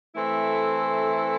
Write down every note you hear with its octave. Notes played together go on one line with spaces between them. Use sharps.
E3 A3 C4 E4 A4